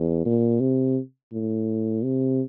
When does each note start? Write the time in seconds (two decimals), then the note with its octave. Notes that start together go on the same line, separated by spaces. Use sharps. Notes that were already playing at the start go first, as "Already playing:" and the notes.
Already playing: E2
0.25 A#2
0.60 C3
1.33 A2
2.04 C3